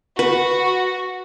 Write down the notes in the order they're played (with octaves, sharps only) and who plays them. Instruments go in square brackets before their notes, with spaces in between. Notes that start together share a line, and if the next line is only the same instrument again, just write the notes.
[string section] F#4 [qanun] B4